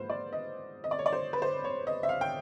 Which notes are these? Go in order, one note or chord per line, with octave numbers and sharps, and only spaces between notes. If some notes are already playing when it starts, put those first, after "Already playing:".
Already playing: G#2 F3 A#3 B4 C5
D5
D#5
D#5
D5
C#5
D5
C5
B4
C5
C#5
D#5
E5
F5
G5